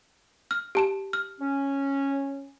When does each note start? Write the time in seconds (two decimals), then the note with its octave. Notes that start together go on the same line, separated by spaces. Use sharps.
0.51 F6
0.75 G4 A5 E7
1.13 F6
1.41 C#4